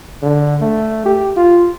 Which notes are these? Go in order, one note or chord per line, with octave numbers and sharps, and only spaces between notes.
D3
A3
G4
F4